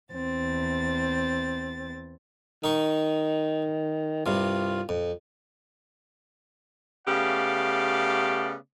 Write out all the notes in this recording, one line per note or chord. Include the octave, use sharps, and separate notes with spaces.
E2 C4 A6
D#3 D#4 C#6
C2 G2 C3 F4
F2
C#3 A3 B3 G4 D5 F5